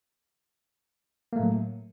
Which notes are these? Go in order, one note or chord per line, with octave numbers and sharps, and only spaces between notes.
A2 F#3 A3 A#3